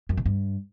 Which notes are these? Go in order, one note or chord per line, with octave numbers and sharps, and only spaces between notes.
F#2
B2
G2